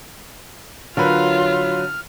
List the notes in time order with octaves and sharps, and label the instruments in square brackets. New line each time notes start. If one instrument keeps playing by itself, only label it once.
[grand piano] D3 A#4 B4 [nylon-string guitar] F#3 C#5 [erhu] F4 [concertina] F6